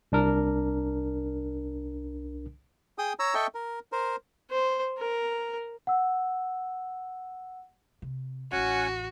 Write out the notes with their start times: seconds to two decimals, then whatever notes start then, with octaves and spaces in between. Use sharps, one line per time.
0.12 C2 D4 A#4
2.98 G#4 G5 D#6
3.19 C#5 A#5 E6
3.34 A4 D#5 E5 G5 C#6
3.55 A#4
3.92 A#4 C5
4.51 C5
4.98 A#4
5.87 F#5 E6
8.02 C3
8.52 A1 E2 C#4 F#4 F#5 G#5